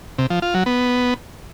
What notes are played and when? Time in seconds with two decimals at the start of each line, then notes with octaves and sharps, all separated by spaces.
0.18 C3
0.30 F3
0.42 F4
0.54 F#3
0.66 B3